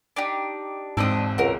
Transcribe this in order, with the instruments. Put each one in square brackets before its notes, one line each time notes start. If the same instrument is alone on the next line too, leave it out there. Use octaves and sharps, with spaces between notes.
[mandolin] D4 D#4 G4
[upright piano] E1 C4 E6 [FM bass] G#2 [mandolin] D4 D#5 D#6
[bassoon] C#2 [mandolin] F#4 A#4